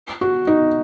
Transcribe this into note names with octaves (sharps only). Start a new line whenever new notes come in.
F#4
D#4